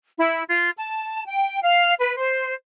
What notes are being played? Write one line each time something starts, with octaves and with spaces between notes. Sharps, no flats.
E4
F4
A5
G5
F5
B4
C5